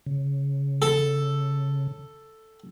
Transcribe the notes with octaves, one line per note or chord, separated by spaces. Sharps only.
C#3
A4